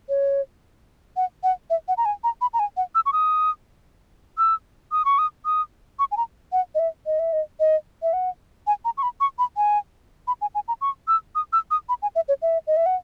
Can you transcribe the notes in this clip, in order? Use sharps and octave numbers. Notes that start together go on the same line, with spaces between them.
C#5
F#5
F#5
E5
F#5
A#5
G#5
A#5
B5
A#5
G#5
F#5
E6
C#6
D#6
E6
D#6
C#6
D#6
D#6
C#6
G#5
A#5
F#5
D#5
E5
D#5
E5
D#5
D#5
E5
F#5
G#5
A#5
C#6
B5
C#6
B5
G#5
B5
G#5
G#5
A#5
C#6
E6
D#6
E6
D#6
B5
G#5
E5
C#5
E5
D#5
E5
F#5